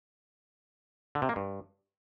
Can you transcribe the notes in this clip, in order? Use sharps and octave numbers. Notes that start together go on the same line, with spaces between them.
D3
C3
A#3
G2